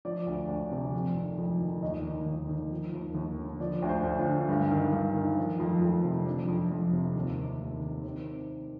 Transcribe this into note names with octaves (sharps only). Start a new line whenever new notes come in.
F3 D5
D2
D2
C3
F2
D#3
F2
D#3
D#2 D#5
D#3
D#2
D#3
F3
D#2
D#2
D3
F3 D5
D2
C5
D2
F4
D3
G2
D#3
G2
D#3
F3
F2
F2
C3
F3 D4
F2
F2
C3
D#2
D#3
D#2
D#3
D#3 C4